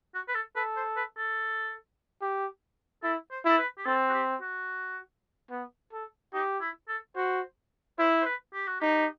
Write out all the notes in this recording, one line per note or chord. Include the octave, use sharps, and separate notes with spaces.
F#4
B4
A4
A4 B4
C5
B4
A4
G4
E4 A4
C5
E4 A4
B4
G4
C4 A4
F#4
G4
F#4
B3
A4
D#4 G4
E4
A4
F#4 C5
E4 C5
C5
B4
G4
F#4
D#4 G4